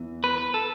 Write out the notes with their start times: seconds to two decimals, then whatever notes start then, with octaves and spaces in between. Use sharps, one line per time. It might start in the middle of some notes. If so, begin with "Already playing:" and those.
Already playing: E2 E3
0.24 B4
0.38 B4
0.54 A4